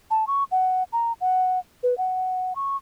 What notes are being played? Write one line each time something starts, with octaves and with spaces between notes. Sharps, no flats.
A5
C#6
F#5
A#5
F#5
B4
F#5
C#6